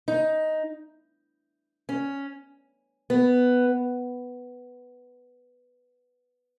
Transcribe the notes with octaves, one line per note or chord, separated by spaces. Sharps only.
D#4
C#4
B3